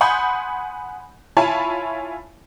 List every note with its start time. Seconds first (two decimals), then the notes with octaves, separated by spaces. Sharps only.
0.01 F#5 G#5 B5 C6 D#6 G6
1.37 E4 F4 C#5 G#5 A5 B5